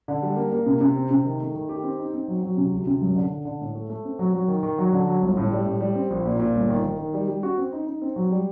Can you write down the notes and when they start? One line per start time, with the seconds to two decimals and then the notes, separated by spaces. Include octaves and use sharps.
0.08 D3
0.22 G3
0.36 A#3
0.52 A#3
0.66 C3
0.81 C3
0.96 C4
1.11 C3
1.25 D#3
1.40 A3
1.55 D#3
1.69 G4
1.84 C4
1.99 D#4
2.14 C4
2.28 F#3
2.43 F#3
2.57 C3
2.72 D2
2.87 C3
3.02 F#2
3.16 D3
3.30 D3
3.45 D3
3.61 A2
3.75 A3
3.90 A3
4.05 C4
4.19 F#3
4.33 F#3
4.48 D#3
4.63 D#3
4.78 F#3
4.93 D3
5.07 F#3
5.22 G1
5.37 A2
5.52 G3
5.66 A2
5.80 G3
5.95 C4
6.10 A#1
6.25 A#2
6.40 A#2
6.54 G1
6.69 D#3
6.84 D#3
6.99 D#3
7.14 G3
7.28 G3
7.43 F#4
7.57 C4
7.73 D#4
7.87 D#4
8.02 C4
8.16 F#3
8.31 G3